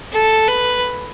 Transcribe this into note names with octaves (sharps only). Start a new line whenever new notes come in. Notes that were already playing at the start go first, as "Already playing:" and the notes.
A4
B4